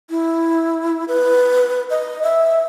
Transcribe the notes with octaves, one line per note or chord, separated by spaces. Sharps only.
E4
B4
D#5
E5